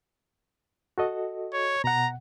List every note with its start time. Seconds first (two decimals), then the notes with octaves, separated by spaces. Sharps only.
0.98 F#4 A4 D#5
1.53 C#5
1.84 B2 F#5 A#5